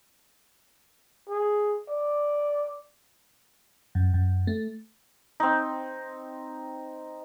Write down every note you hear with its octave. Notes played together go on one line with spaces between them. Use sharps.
G#4
D5
F#2
F#2
A3
C4 D#4